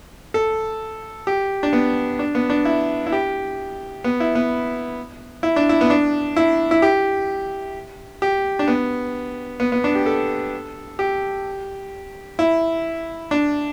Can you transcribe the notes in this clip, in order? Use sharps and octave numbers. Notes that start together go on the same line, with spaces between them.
A4
G4
D4
B3
D4
B3
D4
E4
E4
G4
B3
E4
B3
E4
D4
E4
B3
D4
E4
E4
G4
G4
D4
B3
B3
B3
D4
G4
A4
G4
E4
D4